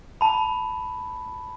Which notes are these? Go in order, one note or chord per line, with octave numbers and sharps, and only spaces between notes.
A5 B5